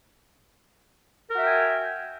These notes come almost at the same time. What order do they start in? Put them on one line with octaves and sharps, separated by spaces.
A#4 F#4 E5 G5 G#5